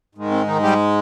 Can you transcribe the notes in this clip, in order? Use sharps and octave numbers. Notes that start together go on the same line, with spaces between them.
G#2 D#3 G#3
C4
D#3 D#4
G3 G4